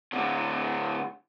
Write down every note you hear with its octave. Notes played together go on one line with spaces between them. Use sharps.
A2 D3